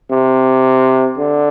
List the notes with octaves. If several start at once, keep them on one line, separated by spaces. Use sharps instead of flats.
C3
D3